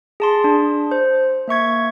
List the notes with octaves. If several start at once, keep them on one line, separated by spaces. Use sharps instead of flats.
G#4 A5 C6
D4
C5
A#3 E5 C#6 G#6